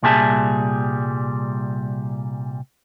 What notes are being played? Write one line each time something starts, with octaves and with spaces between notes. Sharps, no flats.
C2 A#2 G3 G#4 E5 A5